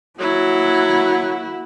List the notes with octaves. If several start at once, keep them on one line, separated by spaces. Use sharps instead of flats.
F#3 A#3 E4 F#4